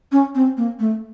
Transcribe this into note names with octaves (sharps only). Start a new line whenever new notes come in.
C#4
C4
A#3
A3